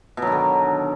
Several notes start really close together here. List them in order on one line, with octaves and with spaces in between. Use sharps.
B2 F#3 D#3 D3